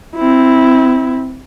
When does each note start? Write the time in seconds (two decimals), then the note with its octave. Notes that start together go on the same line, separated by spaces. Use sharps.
0.16 C4 E4